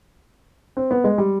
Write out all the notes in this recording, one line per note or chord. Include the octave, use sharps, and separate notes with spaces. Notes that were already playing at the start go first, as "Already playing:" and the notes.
C4
B3
G#3
G3